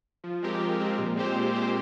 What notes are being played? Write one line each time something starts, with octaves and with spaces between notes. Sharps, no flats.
F3
G#3 C4 G4 A#4
F3
G#3 C4 G4 A#4
A#2
G#3 C4 G4 C5
A#2
G#3 C4 G4 C5